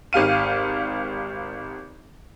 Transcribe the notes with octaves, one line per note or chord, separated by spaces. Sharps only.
G#1 G4 F5 D#7